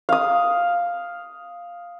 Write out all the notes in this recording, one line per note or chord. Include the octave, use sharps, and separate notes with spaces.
F5 D#6